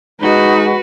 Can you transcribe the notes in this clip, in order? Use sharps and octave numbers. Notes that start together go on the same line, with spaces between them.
G#3 D#4 F#4 B4